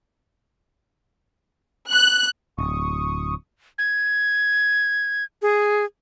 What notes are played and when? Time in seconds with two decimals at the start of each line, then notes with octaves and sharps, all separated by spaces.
1.90 F#6
2.58 D1 C#6 D#6
3.78 G#6
5.42 G#4